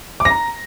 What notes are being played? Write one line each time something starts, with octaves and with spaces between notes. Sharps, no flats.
D6
A#6
A#5